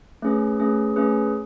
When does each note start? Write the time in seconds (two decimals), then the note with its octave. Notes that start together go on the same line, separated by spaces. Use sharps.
0.22 A3 C#4 G#4 B4
0.60 A3 C#4 G#4 B4
0.96 A3 C#4 G#4 B4